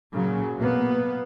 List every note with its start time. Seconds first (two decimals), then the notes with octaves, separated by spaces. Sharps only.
0.11 A#2 C#3 F#3
0.58 B2 A#3 B3